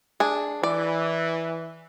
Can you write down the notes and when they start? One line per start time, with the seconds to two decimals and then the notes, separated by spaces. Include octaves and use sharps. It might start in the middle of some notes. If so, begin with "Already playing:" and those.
0.20 D4 G#4
0.63 E3 D5